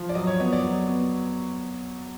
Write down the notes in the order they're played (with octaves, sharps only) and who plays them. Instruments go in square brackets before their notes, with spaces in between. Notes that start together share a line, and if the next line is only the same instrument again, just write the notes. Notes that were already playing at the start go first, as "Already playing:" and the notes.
Already playing: [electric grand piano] F3
[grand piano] D5
[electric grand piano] F#3 [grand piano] D#5
[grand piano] C#5
[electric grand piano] B3 [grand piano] D#5
[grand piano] D5
[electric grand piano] F#3
B3